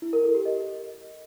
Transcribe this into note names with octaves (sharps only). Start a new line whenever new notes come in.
E4
A#4
A4
G4
D#5